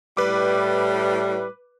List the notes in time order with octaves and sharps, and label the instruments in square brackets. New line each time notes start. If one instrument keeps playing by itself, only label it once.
[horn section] A2 G3 [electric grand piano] B4 D6